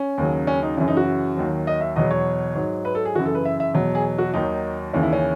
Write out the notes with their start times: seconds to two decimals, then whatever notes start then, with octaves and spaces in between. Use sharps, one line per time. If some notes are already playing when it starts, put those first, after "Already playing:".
Already playing: C#4
0.18 D#2 C#3 F#3
0.47 C#4
0.63 D#4
0.77 F#2 C#3 E3 C#4
0.88 D#4
0.97 F#4
1.37 D#2 D#3 F#3
1.67 D#5
1.81 E5
1.96 E2 B2 F#3 D#5
2.11 C#5
2.55 G#2 F#3
2.85 B4
2.95 A4
3.05 G#4
3.15 F#2 C#3 E3 F#4
3.25 A4
3.35 B4
3.45 E5
3.60 E5
3.74 E2 B2 F#3
3.95 G#4
4.18 F#4
4.34 D#2 D#3 F#3 D#4
4.93 D#2 C#3 E3 C#4
5.03 E4
5.13 C#4